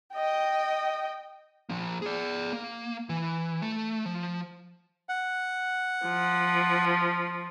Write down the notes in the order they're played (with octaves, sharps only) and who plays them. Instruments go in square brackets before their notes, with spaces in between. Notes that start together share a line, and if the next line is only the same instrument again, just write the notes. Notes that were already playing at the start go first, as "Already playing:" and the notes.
[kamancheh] D#5 G5
[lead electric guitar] F3 A#3
G#4 D5
A#3
E3
A3
F3
[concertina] F#5
[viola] F3